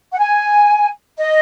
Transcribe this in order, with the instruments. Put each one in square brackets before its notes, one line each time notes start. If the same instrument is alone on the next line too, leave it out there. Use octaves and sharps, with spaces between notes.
[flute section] F#5
G#5
D#5